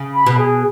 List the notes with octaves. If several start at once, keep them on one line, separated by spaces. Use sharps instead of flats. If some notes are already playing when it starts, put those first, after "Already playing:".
Already playing: C#3
B5
B2
G#4